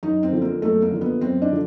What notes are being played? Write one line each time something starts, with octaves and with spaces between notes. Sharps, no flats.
F#2 D#4
C4
D3 F3
A#3
F#2 A3
A#3
D3 F3
B3
F#2 C4
D4
D3 F3